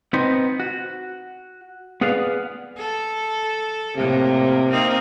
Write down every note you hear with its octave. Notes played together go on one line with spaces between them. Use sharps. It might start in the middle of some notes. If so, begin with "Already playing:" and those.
B3 C4 D#4
F#4
B3 G#4 B4 D5 F5
A4
A2 C3 A#3
A#3 C4 D#4